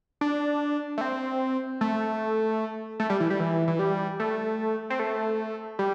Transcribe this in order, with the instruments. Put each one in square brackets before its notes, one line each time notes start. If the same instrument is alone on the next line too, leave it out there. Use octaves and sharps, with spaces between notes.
[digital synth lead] D4
A3
C4
A3
A3
G3
E3
G3
E3
E3
G3
A3
C4
A3
G3